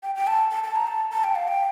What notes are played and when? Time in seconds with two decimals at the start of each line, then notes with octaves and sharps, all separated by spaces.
0.03 G5
0.15 G5
0.27 A5
0.51 A5
0.64 A5
0.76 A#5
0.87 A5
1.12 A5
1.24 G5
1.35 F5
1.48 G5